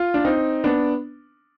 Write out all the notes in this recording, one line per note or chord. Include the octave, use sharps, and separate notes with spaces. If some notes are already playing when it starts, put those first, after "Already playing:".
Already playing: F4
D4
C4 D#4
B3 D4